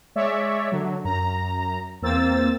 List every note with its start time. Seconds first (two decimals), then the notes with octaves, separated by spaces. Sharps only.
0.16 G#3 C#5 D5 E5
0.72 D3 F#3
1.04 F#2 A#5
2.02 E2 A#3 C4 E6 A6